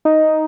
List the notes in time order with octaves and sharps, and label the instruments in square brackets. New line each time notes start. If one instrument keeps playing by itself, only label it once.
[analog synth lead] D#4